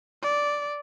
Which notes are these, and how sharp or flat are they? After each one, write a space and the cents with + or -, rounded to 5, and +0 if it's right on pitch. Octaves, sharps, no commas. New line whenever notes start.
D5 -5